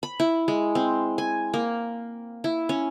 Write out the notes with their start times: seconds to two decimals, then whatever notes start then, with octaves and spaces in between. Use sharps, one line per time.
0.03 B5
0.20 E4
0.48 G#3
0.75 C4
1.18 G#5
1.54 A#3
2.44 E4
2.69 C#4